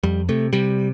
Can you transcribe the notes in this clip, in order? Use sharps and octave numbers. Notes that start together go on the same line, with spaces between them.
F2 G3
C3 A3
C3 G3